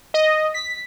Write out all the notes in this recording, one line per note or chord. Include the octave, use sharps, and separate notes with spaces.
D#5
B6